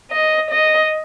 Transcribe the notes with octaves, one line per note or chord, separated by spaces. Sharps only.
D#5
D#5